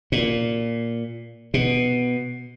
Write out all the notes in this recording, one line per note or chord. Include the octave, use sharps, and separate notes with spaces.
A#2
B2